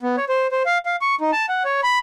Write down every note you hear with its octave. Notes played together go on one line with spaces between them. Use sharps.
B3
C#5
C5
C5
F5
F5
C#6
D#4
A5
F#5
C#5
B5